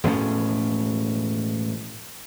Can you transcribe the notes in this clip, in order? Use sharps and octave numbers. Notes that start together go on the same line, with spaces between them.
E1 A2 F3 C#4